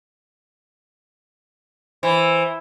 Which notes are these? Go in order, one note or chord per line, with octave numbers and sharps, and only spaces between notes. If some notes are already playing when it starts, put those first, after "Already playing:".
E3 C5